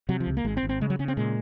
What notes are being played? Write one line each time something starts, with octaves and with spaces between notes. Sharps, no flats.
C3 F#3
F3
C#2
A#3
G#1 G#3
C4
G#1
C4
C#3 G#3
F#3
C#3 C#4
C4
A#2 G#3